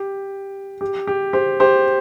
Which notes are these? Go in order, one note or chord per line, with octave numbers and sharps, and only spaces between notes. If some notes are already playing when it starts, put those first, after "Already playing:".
Already playing: G4
G4
G4
G4 C5
G4 C5